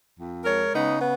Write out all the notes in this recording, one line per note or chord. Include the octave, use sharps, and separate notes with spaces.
F2
G#3 A#4 C#5
C#3 B3 D#4
B3